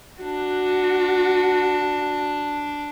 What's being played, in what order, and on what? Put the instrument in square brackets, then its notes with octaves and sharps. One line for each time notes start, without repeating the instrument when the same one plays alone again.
[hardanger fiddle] D4 [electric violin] F#4